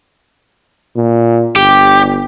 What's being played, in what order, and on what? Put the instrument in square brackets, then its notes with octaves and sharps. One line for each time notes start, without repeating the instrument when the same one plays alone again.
[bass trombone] A#2
[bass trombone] G1 [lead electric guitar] G4